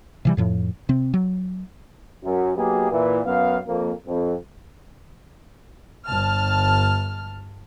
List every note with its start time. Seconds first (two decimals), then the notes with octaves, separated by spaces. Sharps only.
0.25 C3 E3 G3
0.37 F2 A2 F3
0.89 C3 C4
1.14 F#3
2.24 F#2
2.56 F#3 A#3 B3 D#4 G4 G#4
2.91 A#2 E3
3.25 F#2 B3 F5
3.67 F2 A#3
4.06 F2
6.06 G1 A5 F6